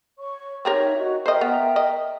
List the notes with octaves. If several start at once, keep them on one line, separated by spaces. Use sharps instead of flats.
C#5 C#6
C4 D#4 G4 A#4 C#5 E5
F#4 D#5
A#4 C5 D#5 E5 G5
B3
D#5